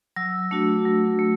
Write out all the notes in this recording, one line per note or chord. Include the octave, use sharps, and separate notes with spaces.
F#3 E6
A3 D4 F#4
F#3
A3